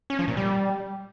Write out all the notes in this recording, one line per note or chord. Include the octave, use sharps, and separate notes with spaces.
C#4
F3
A#2
G3